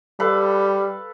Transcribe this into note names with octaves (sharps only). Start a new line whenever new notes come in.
G3 A4 B4 F5